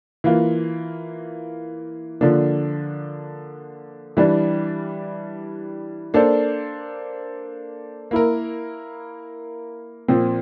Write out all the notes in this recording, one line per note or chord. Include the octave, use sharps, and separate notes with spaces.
E3 A#3 F4
D3 F3 A#3 D4
E3 G3 D4
A#3 D4 A4 C5
A#3 E4 A#4
A#2 F3 C4